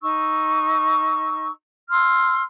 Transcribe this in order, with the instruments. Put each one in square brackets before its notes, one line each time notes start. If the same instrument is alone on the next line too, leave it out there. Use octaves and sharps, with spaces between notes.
[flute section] D#4 C#6 E6
C6 E6 F6